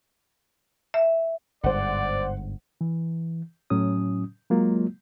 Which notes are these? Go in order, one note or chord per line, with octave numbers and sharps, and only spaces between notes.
E5
G1 G#2 C5 D5 F#5
E3
A2 F#3 C#4 D#6
F#3 G#3 A#3 F4